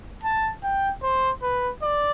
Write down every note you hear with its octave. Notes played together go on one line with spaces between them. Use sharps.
A5
G5
C5
B4
D5